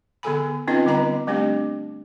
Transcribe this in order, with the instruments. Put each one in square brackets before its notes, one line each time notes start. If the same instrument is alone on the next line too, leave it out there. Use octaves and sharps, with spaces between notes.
[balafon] D3 B3 G#4 A4 G#5 B5
C4 C#4 D#4 F4 B4 D#5
D3 G3 B3 D#5 A#5 B5
G3 A3 C4 D4 G4